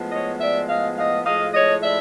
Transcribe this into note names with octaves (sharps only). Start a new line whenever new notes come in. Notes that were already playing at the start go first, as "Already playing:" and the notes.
Already playing: A2 F3 G#3 B3
C#5 D#5
D5 E5
D#5 F5
D#5 F5
A2 F3 G#3 D#5 F5
C#5 D#5
D5 E5